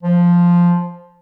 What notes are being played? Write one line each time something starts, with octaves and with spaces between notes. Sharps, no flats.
F3